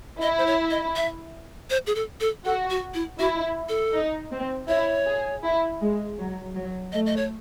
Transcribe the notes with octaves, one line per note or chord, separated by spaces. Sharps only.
E4 D#5
C5
C#5
D#5
E5
C5
G#4
A4
A4
F#4 A4
F#4
E4
E4 F#4
A4
D#4
C4
E4 C#5
G#4
E4
G#3
F#3
F#3
A3 D#5
D#5
C#5